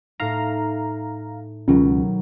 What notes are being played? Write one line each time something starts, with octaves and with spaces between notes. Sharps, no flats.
A2 D#4 F5 A#5
C#2 B2 D#3 F#3